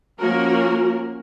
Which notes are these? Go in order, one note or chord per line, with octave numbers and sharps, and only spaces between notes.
F3 A#3 C#4 F#4 A#4